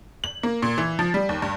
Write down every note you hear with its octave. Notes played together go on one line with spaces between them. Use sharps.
F#7
A#3
A#2
E3
F3
G3
D#2
G2